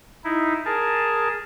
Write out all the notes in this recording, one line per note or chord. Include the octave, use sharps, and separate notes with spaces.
D#4 E4
G#4 A#4 A5